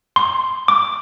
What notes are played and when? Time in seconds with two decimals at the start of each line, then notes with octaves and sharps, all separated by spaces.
0.16 C6
0.68 D6